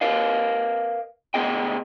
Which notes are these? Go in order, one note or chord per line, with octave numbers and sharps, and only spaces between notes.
A#4 B4 D#5 F5
D2 B3 G#4 D#5 G5